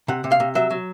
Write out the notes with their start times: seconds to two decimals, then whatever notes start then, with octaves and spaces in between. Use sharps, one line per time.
0.08 C3 F#5
0.24 C3
0.32 F5
0.40 C3
0.55 F#3 E5
0.70 F#3